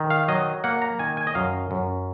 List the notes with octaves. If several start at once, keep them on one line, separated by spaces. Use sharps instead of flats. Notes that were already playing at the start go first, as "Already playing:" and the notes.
Already playing: D#3
F5
F#3 D#5
A#3 F#5
A#5
D#3 G#5
G#5
D#5
F#2 F5
F#2